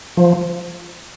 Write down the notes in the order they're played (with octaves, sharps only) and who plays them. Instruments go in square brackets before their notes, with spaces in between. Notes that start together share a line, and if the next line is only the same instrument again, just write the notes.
[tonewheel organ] F3